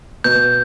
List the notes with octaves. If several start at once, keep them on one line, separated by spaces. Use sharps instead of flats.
B2 G6